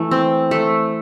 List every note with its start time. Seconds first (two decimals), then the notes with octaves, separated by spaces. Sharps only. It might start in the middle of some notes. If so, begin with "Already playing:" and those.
Already playing: E3 A3
0.11 C4
0.51 A3